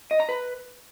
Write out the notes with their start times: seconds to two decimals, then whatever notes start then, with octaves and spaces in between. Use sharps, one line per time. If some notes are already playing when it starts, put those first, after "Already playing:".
0.11 D#5
0.20 A#5
0.29 B4